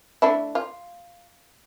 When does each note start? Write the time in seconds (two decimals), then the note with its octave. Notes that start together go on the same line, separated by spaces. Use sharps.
0.22 A3 D4 E4
0.55 F4